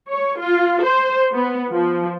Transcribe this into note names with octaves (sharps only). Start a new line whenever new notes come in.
C#5
F4
C5
B3
F3